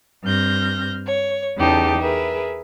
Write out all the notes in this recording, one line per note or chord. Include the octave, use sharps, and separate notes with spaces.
G2 C4 F6 G6 A#6
C#5
E2 C#3 D#4 G4 A4
G#4 A#4 B4 E5